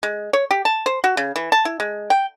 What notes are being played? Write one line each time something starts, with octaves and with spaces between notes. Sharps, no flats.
G#3
C#5
G4
A5
C5
F#4
C#3
E3
A5
E4
G#3
G5